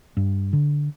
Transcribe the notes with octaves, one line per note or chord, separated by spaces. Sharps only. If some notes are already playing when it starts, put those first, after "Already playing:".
G2
D3